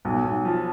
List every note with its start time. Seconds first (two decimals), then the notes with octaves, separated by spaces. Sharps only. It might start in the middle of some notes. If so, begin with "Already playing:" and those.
0.05 B1
0.24 B1
0.45 F3